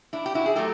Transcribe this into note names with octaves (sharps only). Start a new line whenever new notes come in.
D4 E4
G4
E4 F#4
G#4
F#3 A3 G4 A4